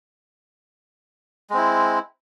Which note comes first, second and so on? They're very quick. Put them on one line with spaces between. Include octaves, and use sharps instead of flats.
G#3 C4 E4